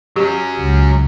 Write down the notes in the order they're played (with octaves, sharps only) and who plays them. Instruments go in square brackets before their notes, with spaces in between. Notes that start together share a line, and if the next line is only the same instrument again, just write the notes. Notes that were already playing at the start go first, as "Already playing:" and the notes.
[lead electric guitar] F#3 C#4 [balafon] G4
[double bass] C#2